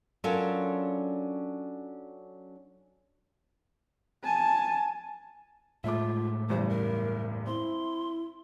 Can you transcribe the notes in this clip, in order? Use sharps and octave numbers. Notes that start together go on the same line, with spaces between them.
F#3 C#4 D4 F4 A4 A#4
G#5 A5
A2 G#3 A3 F4 E5 D6
F#1 E2 G2 C5
A#4
C4 E4 C6